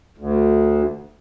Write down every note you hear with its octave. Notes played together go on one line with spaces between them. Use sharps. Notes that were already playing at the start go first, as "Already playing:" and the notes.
D2